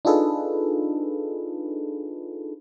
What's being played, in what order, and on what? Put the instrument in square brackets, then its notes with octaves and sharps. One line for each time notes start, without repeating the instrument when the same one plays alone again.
[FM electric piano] D4 D#4 F4 G#4 A4 B4